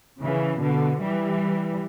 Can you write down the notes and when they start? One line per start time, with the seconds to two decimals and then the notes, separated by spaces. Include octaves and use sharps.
0.21 C#3 E3
0.60 B2 D3
1.01 E3 G3